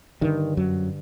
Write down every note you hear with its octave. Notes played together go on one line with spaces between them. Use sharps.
G2 D3 D#3
F#2 F#3